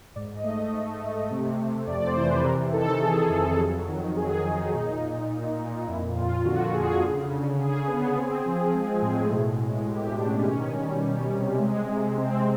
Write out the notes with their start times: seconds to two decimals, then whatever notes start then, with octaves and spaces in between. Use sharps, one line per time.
0.16 G#2 D5
0.35 D#5
0.44 A3
0.73 A3
1.02 A3
1.31 C3
1.58 C3
1.87 F2 D5
2.07 C5
2.17 E3
2.26 B4
2.44 C3 A#4
2.73 D#3 A4
3.01 D#3 G#4
3.30 F2
3.59 F#3
3.88 D#3
4.16 F#3 G#4
4.45 D#3 D#4
4.74 A#2 D#4
5.03 A#2
5.30 A#2
5.59 A#2
5.87 F2 E4
6.16 F2 F4
6.45 D3 F#4
6.74 D3 G#4
7.02 C#3
7.30 C#3
7.59 C#3 G#4
7.88 B3
8.16 C4
8.46 F3
8.74 G#3
9.02 A2
9.31 B2
9.60 G#3
9.88 B2 G4
10.07 D4
10.16 B2
10.26 C#4
10.45 D#3 C#4
10.74 G3
11.03 G3
11.32 C3
11.59 G#3
11.88 C3
12.17 C4